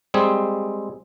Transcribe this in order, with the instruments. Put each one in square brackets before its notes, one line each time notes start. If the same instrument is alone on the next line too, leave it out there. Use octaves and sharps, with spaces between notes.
[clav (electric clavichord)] G3 G#3 C4 G#4